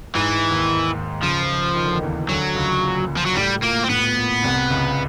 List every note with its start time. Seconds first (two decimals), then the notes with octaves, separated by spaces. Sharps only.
0.15 G#2 E3 G#3
0.50 D#2 D#3
1.22 C#2 C#3 F3
1.75 D#3
1.84 D3
1.93 D#2 D#3
2.02 E2 E3
2.24 D#3
2.29 D2 D3 F#3
2.55 C#2 C#3
2.82 A#2
3.17 F3
3.26 F#3
3.36 A2 G3
3.63 A#2 A#3
3.84 C4
3.90 A2 B3
4.17 A#2
4.43 C2 C3
4.70 C#2 C#3